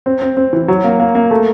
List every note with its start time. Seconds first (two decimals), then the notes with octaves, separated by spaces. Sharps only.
0.06 C4
0.21 C4
0.37 C4
0.53 E3
0.68 F#3
0.84 A#3
1.00 A#3
1.15 A#3
1.31 A3